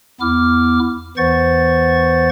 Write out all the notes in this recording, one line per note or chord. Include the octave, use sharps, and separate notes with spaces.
E2 B3 E4 D6 F6
E2 E3 C5 F#5 C#6 A6